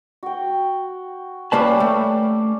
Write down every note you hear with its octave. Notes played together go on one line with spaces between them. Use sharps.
F#4 G5
G3 A#3 C#4 B4 D5 A5
A3